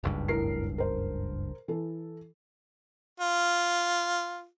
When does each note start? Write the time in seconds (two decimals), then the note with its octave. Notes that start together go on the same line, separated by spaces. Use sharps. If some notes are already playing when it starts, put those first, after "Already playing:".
0.04 F#1 C#2 G2
0.28 A2 A#4 C7
0.78 A#4 C5
1.68 E3 A4
3.20 F4